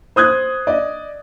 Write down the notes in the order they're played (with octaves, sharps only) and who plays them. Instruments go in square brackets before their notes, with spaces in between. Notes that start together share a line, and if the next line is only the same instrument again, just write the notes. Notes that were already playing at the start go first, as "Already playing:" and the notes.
[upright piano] C5 D#6 F#6 G#6
D5 D#5